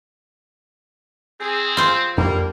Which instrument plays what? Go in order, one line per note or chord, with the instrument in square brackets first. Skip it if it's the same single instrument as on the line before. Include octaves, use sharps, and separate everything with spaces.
[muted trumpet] C4 [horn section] G#4
[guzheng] F4 C5
[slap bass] F2 D4 [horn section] G3 A#3